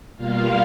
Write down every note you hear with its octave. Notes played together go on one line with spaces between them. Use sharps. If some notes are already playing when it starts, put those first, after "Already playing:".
B2 G3 A#3 F4 F5